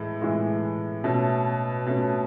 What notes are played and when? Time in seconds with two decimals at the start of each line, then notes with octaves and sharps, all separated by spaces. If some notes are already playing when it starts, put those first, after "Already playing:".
Already playing: A2 E3 G#3
0.21 A2 E3 G#3
1.04 B2 A3 C#4
1.86 B2 A3 C#4